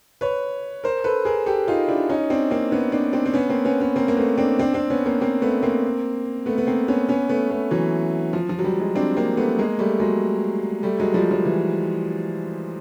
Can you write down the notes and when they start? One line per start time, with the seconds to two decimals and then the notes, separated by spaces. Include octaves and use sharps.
0.21 B4 C#5
0.84 A#4 C5
1.04 A4 B4
1.25 G#4 A#4
1.46 G4 A4
1.67 D#4 F4
1.88 D4 E4
2.09 C#4 D#4
2.30 C4 D4
2.51 A#3 C4
2.72 B3 C#4
2.92 C4 D4
3.13 C4 D4
3.26 C4
3.34 B3 C#4
3.49 A#3 C4
3.65 B3 C#4
3.80 B3 C#4
3.96 A#3 C4
4.08 A#3
4.17 A3 B3
4.38 C4 D4
4.59 C4 D4
4.74 C4 D4
4.90 B3 C#4
5.06 A#3 C4
5.21 A#3 C4
5.42 A3 B3
5.63 A#3 C4
6.46 A3 B3
6.58 B3
6.67 A#3 C4
6.88 B3 C#4
7.08 B3 C#4
7.29 A3 B3
7.50 A3 B3
7.71 E3 F#3
8.33 F3
8.49 F3
8.59 F#3
8.64 F3 G3
8.80 F#3 G#3
8.95 C4 D4
9.17 A#3 C4
9.37 A3 B3
9.59 G#3 A#3
9.79 G3 A3
10.00 F#3 G#3
10.83 G3 A3
11.00 F#3 G#3
11.14 F3 G3
11.31 F3
11.45 E3